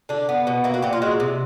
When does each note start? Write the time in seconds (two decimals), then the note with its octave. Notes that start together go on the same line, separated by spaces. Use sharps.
0.09 D3 D4
0.29 B3
0.47 B2
0.64 A#3 E4
0.74 F#4
0.82 A#2 G4
0.93 F4
1.02 G#3 F#4
1.20 C3